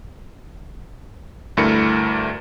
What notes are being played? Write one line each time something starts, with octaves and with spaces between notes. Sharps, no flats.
D2 G2 A3 E4 A#4 C#7